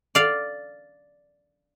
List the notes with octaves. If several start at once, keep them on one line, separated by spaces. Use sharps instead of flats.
D5 F5